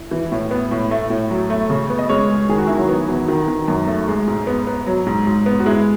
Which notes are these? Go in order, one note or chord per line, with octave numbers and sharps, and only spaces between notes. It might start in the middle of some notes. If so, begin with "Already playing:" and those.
Already playing: E4
E3
A2
B3
A2
A3
A2
F#3
A3
C#3
B3
D#5
G#3 C#4 C#5
G#3
D#3 G#4
F#4
D#3 E4
F#3 F#4
B3
E2
D#3
D#3
F#2
A3
G#3
G#2
B3
B3
F#3
G#2
G#2
B3
F#4
G#3 E4